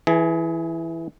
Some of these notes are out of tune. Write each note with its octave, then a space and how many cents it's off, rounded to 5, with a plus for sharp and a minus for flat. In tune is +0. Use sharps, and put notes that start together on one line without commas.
E3 +0 G#4 +30